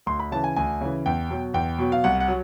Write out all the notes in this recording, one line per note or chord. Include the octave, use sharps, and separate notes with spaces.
D2 C6
B5
C#3 E3 A5
G#5
D2 G#5
C#3 E3
E2 G5
B2 F#3
E2 G5
B2 F#3
F5
C2 F#5
F#5
F#3